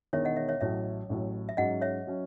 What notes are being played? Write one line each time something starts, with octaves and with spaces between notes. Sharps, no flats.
E1 E2 D#3 C#5 E5
D#5 F#5
C#5 E5
C#5 E5
A1 A2 F#3 C#5 E5
A1 A2 F#3
E5
G#2 F#3 C#4 D#5 F#5
C#5 E5
F#3 C#4